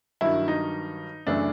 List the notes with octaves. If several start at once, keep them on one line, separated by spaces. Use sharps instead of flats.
G2 D#3 F#3 E4
D#4
F#2 C#3 E3 A3 D4